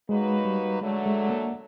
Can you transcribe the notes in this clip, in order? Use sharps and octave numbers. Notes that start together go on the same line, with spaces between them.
F#3 G#3 A#3 D#4 F#4 B4
G3
D3 F#3 G#3 A3
G#3
A#3